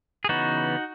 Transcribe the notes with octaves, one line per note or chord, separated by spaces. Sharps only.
G#4
C#3 E3 B3 D#4 F#4